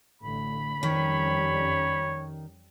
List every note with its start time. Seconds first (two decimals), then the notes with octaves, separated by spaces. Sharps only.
0.22 A1 D3 A3 B5
0.83 F2 D#3 G3 C#4 C#5